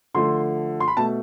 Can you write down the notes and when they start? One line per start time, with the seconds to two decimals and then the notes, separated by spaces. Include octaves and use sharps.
0.14 D3 F3 A3 C6
0.80 C6
0.88 B5
0.97 B2 A3 A5